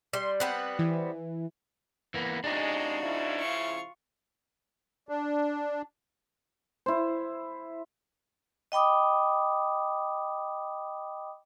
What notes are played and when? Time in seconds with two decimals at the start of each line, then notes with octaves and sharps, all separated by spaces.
0.13 G3 C6
0.40 G3 B3 C4 F#6
0.79 E3
2.14 E3 A#3 B3
2.44 C3 G#3 D4 D#4 F4 F#4
3.02 C#3 F3 E4
3.40 F4 C#6
5.09 D4
6.86 E4 C5
8.72 D#5 G5 B5 D6 D#6